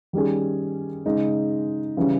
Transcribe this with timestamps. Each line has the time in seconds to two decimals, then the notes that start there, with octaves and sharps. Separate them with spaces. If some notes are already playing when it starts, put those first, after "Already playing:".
0.13 D#3 G3 C#4 G#4
1.06 C#3 G#3 D#4
1.97 C#3 E3 G3 C#4